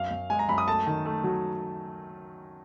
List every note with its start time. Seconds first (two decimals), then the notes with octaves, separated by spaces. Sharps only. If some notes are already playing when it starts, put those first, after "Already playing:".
Already playing: F#2 F5
0.11 F#2
0.30 G#3 G#5
0.39 A#5
0.49 F#2 B5
0.58 D#6
0.68 A3 A5
0.86 D#3
1.05 A3
1.24 F#3